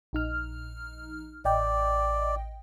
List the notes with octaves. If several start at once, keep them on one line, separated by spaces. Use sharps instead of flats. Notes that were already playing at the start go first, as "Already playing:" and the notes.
A#1 D#4 F6
A1 D5 D#5 G5